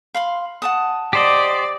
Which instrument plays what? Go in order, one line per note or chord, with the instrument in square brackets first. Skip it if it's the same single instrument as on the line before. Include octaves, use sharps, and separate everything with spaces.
[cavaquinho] F5 B5 C6
F#5 A5 D#6
[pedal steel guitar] G4 C5 D#5 [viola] D5